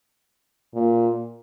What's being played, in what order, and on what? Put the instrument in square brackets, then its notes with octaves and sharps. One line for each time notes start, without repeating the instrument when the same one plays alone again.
[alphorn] A#2